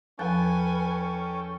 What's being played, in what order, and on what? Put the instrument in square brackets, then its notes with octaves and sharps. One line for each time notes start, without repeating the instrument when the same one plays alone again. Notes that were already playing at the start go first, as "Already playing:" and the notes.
[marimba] E2 F3 F#6 [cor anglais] C#4 [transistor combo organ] A4 G5 [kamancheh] B4 G#5